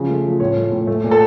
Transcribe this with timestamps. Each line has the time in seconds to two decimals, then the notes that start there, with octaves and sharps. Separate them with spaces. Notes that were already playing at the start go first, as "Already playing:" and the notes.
Already playing: C#3 F3
0.09 A3
0.25 F3
0.40 A2 C#5
0.56 A3
0.72 A2
0.87 A3
1.04 A#2
1.11 A4